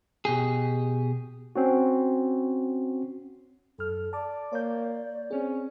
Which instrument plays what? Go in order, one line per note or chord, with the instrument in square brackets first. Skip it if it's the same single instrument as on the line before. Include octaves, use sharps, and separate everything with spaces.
[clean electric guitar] B2 G4 G#4
[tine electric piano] C4 C#4 F#4
[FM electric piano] F#2 F6 [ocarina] A4
[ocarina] D5 [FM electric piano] A5 D6
[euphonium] A#3 [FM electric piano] C#5 G6
[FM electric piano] C4 G#4 [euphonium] C#4